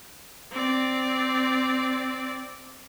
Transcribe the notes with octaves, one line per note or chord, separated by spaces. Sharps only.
C4 D5